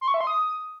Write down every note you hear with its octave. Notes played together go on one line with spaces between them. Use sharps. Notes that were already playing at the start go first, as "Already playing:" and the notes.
C6
C#6
E5
C6
D#6